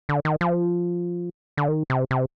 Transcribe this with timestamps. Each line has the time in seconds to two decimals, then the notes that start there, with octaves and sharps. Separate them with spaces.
0.09 D3
0.25 D#3
0.41 F3
1.57 D3
1.68 D#3
1.90 C3
2.11 C3